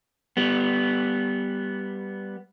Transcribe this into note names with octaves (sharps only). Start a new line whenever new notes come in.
G3 B3